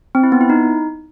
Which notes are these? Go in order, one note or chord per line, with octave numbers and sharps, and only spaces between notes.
C4
E4
B3
E4
D#4